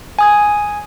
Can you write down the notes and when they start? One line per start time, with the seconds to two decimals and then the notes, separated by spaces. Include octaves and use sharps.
0.19 G#5 D#6 G#6